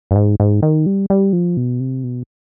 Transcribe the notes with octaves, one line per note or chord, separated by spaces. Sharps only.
G2
G#2
G#2
D#3
G3
G3
F3
B2
C3
B2